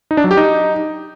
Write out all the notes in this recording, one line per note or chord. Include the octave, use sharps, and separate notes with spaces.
D#4
D4
F#3
G4
D#4